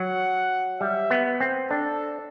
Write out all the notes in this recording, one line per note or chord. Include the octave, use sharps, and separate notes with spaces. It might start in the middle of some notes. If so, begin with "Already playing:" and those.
Already playing: F#3 F#5
G3 E5
B3
C4
D4 A4